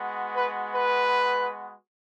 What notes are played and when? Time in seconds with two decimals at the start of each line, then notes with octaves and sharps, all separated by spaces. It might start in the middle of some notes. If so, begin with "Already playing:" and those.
Already playing: G#3 B3 F#4
0.35 B4
0.75 B4